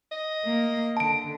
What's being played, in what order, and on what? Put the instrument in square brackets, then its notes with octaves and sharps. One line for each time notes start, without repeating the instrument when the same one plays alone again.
[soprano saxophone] D#5
[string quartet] A#3
[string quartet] D3 [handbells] A5 D7